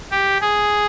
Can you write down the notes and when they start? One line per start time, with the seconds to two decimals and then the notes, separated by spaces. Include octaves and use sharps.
0.11 G4
0.41 G#4